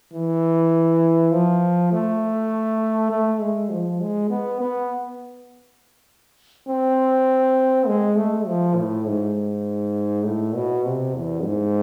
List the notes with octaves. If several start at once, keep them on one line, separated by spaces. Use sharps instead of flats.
E3
F3
A3
A3
G#3
F3
G#3
B3
B3
C4
G#3
A3
F3
A2
G#2
A2
B2
C3
E2
G#2